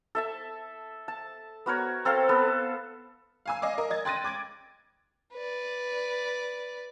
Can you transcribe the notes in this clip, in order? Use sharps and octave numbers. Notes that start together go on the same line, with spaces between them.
A4 E5 A5
A5
B3 F#4 A#4 C#5
C4 A4 A#4 F5
B3 A4
F5 G#5 E6
D#5 F5 G#5 D6
A#4 D#5
D#5 G#6 A6
G5 C6 F#6 A6 A#6 D#7
D6 G#6 A6 D7
B4 D5